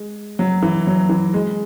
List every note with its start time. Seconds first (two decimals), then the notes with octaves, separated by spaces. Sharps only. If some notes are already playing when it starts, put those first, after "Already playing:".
Already playing: G#3
0.39 F#3
0.63 E3
0.87 F#3
1.09 E3
1.34 G#3